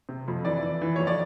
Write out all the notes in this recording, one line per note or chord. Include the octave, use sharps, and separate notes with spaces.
C3
F2
E3 D5
E3
E3
F2 C#5
D5